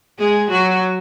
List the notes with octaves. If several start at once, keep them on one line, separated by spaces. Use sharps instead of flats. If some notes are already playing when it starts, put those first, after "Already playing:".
G#3 G#4
F#3 F#4